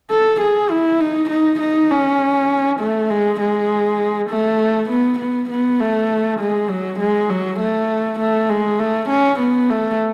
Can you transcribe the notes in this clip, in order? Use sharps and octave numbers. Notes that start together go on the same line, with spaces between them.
A4
G#4
E4
D#4
D#4
D#4
C#4
A3
G#3
G#3
A3
B3
B3
B3
A3
G#3
F#3
G#3
F#3
A3
A3
G#3
A3
C#4
B3
A3